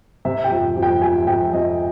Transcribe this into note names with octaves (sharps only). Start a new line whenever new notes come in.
C3 E5
G5
F2
F2
G5
F3 G#5
F2 G5
F2 D#5